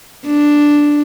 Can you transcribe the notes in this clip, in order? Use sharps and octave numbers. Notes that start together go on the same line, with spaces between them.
D4